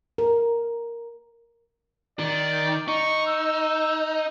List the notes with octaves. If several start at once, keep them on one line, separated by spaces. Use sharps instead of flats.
A#4
D#3 D5
D#4 C#6
E6